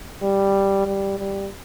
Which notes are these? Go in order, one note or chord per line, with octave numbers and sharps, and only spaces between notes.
G3
G3
G3